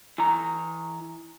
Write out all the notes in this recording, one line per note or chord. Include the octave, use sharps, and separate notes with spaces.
E3 A#5